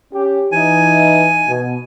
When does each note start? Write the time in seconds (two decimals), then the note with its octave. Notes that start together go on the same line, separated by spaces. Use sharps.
0.14 C#4 G4
0.52 E3 D#4 G#5
1.48 B2